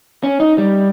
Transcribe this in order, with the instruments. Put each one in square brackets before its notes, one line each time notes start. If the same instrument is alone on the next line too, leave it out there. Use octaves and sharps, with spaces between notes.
[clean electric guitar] C#4
D#4
G3